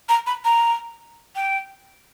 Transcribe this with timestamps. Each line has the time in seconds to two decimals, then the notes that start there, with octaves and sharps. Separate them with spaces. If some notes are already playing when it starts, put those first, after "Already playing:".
0.09 A#5
0.27 B5
0.45 A#5
1.36 G5